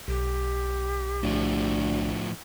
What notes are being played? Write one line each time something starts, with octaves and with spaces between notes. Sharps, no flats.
B1 G4
D2 A2 F3